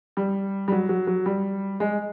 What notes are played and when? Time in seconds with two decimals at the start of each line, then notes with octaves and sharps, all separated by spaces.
0.17 G3
0.68 G3
0.72 F#3
0.89 F#3
1.07 F#3
1.26 G3
1.80 G#3